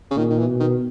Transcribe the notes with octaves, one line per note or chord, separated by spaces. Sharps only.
C#3
A#2 D#3
D#3
E3
B2
D#3